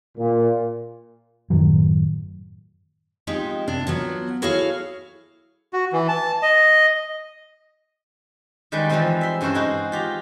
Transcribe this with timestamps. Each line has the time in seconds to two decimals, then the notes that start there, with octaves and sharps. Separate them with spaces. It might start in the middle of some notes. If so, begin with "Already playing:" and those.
0.18 A#2
1.50 F#2 A2 D#3 F#3
3.27 F3 G#3 C4 D#4 G4
3.67 F#2 C3 D4
3.87 F3 F#3 B3
4.42 E4 F#4 G#4 A4 C#5 F5
5.73 F#4
5.93 E3
6.08 A5
6.43 D#5
8.72 D#3 G3 G#3 B4 D5
8.89 E3 F3 G3 G#3 C4 D#4
9.21 E5 C6
9.41 G2 C#3 E4 F#4 C5
9.55 G#3 D#4 F#4
9.92 F4 G4 A#5